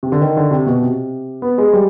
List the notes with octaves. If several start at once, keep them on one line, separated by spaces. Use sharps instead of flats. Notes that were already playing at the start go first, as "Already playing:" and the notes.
C3
D3
D#3
D3
C3
B2
C3
B3
G#3
G3